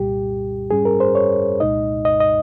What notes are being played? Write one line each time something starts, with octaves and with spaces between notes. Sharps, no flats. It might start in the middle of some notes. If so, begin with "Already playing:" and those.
Already playing: C2 A#2 G3 G4
G#2 G3 C#4 G#4
A#4
C5
C#5
C2 A#2 G#3 D#4 D#5
D#5
D#5